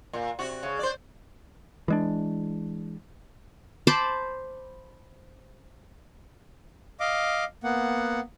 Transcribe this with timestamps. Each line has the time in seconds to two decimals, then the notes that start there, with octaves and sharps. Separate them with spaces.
0.13 A#2
0.39 C3 F#4
0.63 C#3
0.79 C5 D5
1.88 E3 G#3 D4
3.87 C5 A5 B5 D6
7.00 D#5 F5 D6
7.64 A#3 B3 F#5